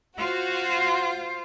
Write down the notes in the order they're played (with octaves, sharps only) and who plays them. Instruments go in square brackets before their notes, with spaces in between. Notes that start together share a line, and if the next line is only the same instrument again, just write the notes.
[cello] F4 C5 [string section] F#4